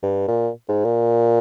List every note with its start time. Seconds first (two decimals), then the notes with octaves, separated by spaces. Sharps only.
0.03 G2
0.27 A#2
0.69 G#2
0.85 A#2